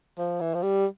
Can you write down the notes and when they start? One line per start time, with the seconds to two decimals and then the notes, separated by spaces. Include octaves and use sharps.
0.18 F3
0.40 E3
0.54 F3
0.63 G3